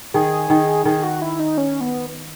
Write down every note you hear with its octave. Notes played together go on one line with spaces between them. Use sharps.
D#3 G#4
D#3
D#3 G#4
F#4
E4
D#4
C#4
B3